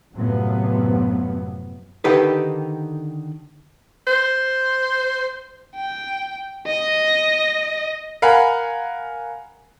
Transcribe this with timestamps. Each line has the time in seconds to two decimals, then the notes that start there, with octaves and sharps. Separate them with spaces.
0.15 F#2 A2 C3 F3 F#3 B3
2.04 D3 D#3 D#4 G4 A4 B4
4.07 C5
5.76 G5
6.66 D#5
8.22 A#4 F5 F#5 G#5 B5